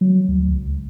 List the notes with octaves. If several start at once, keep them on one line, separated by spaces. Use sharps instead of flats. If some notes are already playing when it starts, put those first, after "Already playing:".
F#3
D2
C#2